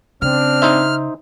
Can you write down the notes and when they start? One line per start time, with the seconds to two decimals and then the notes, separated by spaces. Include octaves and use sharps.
0.22 C#3 C4 D4 F6
0.62 D#4 C5 E5